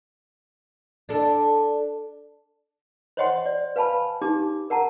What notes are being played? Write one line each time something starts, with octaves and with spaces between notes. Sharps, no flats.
D4 A4
C5 C#5 D#5 F#5 G5 C6
D5
B4 F5 G#5 A5 B5
D4 D#4 G4 D6
A#4 F#5 A5 A#5